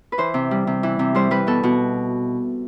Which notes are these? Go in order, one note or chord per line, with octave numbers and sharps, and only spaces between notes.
B4
E3 C5
C3
G3
C3
E3
C3
G3 C5
G3 B4
B2 A4
B2 F#4